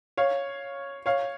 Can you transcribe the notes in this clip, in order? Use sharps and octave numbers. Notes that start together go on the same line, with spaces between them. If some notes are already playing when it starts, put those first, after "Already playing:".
C#5 F5
C#5 F5